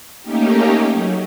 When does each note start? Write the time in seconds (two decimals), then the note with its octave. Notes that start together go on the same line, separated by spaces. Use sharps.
0.22 A3 A#3 C#4 D#4 G4
0.93 F#3